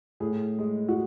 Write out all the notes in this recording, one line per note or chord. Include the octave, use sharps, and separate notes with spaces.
A2 G#4
G#3
F#4